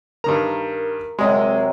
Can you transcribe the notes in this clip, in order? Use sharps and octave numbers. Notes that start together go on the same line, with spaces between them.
G2 D#3 A#4 A#5
C3 F#3 G#3 C4 G#4 D#5